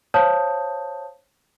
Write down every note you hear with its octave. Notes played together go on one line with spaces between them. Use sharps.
C5 C#5 F5 A5 D#6 G6